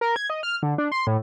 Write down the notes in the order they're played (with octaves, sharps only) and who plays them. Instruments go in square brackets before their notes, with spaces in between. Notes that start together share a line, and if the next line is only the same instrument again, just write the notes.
[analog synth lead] A#4
G#6
D#5
F6
D3
D4
C6
A2